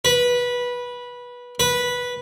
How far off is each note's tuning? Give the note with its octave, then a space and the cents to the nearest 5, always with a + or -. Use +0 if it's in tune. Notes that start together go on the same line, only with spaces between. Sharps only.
B4 -15
B4 -10